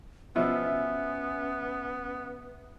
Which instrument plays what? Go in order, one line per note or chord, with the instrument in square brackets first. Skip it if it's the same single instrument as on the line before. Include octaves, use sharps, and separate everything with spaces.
[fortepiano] B2 F3 [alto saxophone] B3 [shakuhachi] C#4 [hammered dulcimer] E5